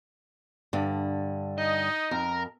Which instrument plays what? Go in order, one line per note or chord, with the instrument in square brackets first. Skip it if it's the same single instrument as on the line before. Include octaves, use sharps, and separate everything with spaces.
[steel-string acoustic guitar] G2 D3
[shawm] D#4 [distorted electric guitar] D#5
[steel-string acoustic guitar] F2 [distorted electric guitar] A#4